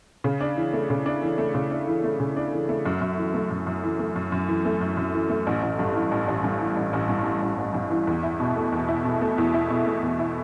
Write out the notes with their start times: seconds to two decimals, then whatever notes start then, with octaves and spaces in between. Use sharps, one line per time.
0.24 C#3
0.41 D4
0.57 E3
0.73 A3
0.90 C#3
1.06 D4
1.22 E3
1.38 A3
1.55 C#3
1.71 D4
1.87 E3
2.04 A3
2.20 C#3
2.36 D4
2.53 E3
2.69 A3
2.85 F#2
3.01 F#2
3.18 E3
3.34 A3
3.50 F#2
3.67 F#2
3.83 E3
3.99 A3
4.16 F#2
4.32 F#2
4.48 E3
4.65 A3
4.81 F#2
4.97 F#2
5.14 E3
5.29 A3
5.47 A1
5.62 A1
5.79 G2
5.95 E3
6.11 A1
6.28 A1
6.44 G2
6.60 E3
6.77 A1
6.93 A1
7.09 G2
7.25 E3
7.42 A1
7.58 A1
7.74 G2
7.91 E3
8.07 E2
8.23 E4
8.40 B2
8.56 A3
8.72 E2
8.88 E4
9.05 B2
9.21 A3
9.38 E2
9.54 E4
9.70 B2
9.86 A3
10.02 E2
10.19 E4